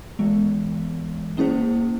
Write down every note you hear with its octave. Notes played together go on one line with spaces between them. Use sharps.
E3 G#3 B3
A#3 C#4 E4 G#4 C5